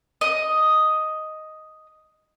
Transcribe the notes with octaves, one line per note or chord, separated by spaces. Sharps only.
D#5 D#6